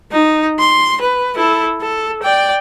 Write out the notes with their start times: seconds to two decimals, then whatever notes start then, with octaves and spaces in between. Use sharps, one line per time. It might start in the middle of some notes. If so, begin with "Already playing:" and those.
0.11 D#4
0.59 C6
1.01 B4
1.36 E4 A4
1.81 A4
2.23 D5 G5